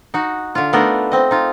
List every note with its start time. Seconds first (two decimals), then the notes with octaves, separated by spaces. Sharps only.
0.14 D#4 F#4
0.55 D3 F4
0.73 A3 B3 D4 D#4 A#4 D#5
1.12 C4 D#5
1.31 D#4 F4